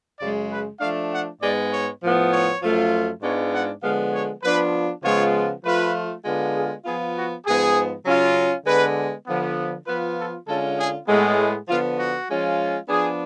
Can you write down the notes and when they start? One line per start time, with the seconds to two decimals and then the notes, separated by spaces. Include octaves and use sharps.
0.20 F#2 C#3 G#3 D5
0.51 B4
0.80 F3 A3 D4 F5
1.11 F#5
1.40 G#2 G#3 B3 D5
1.71 C#5
2.02 A2 F3 B3
2.31 C#5
2.62 F#2 F3 A3 F4
3.22 G#2 G#3 B3 D4 F4 C#5
3.53 F#5
3.82 D3 F3 G#3 B3 F5
4.13 C#5
4.43 F3 B3 D4 F4 B4
5.03 C#3 F3 G#3 B3 F4 C#5
5.64 F3 A3 F4 B4
6.25 D3 G#3 B3 F4
6.55 G#4
6.84 F3 B3 F4 G#4
7.15 F#4
7.46 G#2 F3 B3 G#4
8.05 C#3 F#3 C#4 F4
8.66 D3 G#3 B3 B4
9.26 D3 F3 B3
9.86 F3 B3 F4 B4
10.17 A4
10.47 D3 G#3 C#4 F4 A4
10.78 G#4
11.08 A2 G#3 B3
11.68 D3 F3 B3 F4
11.98 F#4
12.28 F3 G#3 C#4 F4
12.88 F3 B3 D4 G#4